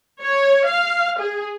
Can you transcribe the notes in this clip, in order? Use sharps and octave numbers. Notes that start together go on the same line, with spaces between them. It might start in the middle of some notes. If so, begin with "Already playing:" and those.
C#5
F5
G#4